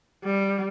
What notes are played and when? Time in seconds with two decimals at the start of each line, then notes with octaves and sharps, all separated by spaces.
0.24 G3